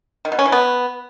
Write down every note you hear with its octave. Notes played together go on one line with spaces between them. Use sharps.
D#3
B2
C#4
E3
B3